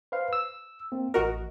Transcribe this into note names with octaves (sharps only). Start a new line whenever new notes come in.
B4 C5 F5
E6
A#3 C4
A1 F#4 A#4 D#5